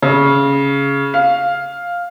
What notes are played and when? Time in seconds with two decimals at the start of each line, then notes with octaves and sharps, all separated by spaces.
0.02 C#3
1.14 F5